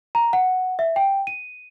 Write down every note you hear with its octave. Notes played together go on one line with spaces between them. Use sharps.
A#5
F#5
E5
G5
D#7